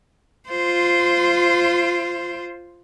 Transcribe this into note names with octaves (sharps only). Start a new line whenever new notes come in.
F4 C5